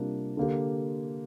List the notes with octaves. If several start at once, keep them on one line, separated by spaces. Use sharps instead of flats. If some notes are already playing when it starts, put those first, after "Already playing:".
Already playing: C3 G3 A#3 D4 F4
D3 A#3 G4